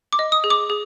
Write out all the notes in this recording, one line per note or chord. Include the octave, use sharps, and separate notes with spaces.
D6
D#5
D#6
G#4
D6
G#4